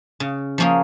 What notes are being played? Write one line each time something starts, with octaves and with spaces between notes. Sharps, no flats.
C#3
F3 A#3 C#4 G#4